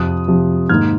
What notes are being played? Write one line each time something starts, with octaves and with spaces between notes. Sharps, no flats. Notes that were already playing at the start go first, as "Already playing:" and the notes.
Already playing: F2 C3 F3 D#6 F#6
F2 C3 F3
G#2 D#3 A#3 F6 G#6